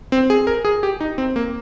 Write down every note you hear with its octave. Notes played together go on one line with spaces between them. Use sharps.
C4
G#4
A#4
G#4
G4
D#4
C4
A#3